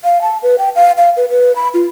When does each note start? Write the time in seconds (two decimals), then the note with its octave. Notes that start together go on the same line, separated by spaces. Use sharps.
0.04 F5
0.22 A5
0.43 B4
0.59 G5
0.75 F5
0.97 F5
1.17 B4
1.29 B4
1.56 B5
1.74 F4